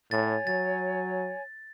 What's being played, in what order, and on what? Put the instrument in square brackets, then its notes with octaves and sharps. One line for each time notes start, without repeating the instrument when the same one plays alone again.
[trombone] A2 [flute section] C#5 G#5 [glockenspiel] A6
[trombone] F#3 [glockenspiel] A6